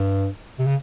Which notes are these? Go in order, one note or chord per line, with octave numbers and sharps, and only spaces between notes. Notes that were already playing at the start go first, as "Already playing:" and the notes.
Already playing: G2
C3
C#3